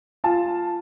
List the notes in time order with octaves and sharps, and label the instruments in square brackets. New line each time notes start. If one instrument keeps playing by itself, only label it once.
[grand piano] F4 A5